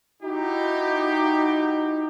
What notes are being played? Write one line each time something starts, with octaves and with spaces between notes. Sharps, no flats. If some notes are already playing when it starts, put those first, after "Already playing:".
D#4 E4 F#4 G4